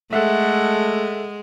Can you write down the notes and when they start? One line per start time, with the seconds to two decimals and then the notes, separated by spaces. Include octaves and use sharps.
0.13 G#3 A3 A4 E5 F#5